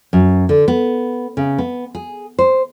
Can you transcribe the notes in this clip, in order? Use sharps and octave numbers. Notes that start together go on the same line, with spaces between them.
F#2
D3
B3
C#3
B3
G#4
C5